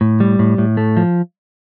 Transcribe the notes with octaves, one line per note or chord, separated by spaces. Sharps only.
A2
G3
A2
A2
A3
F3